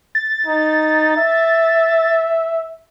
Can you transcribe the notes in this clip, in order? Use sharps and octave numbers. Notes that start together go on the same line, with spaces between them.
A6
D#4
E5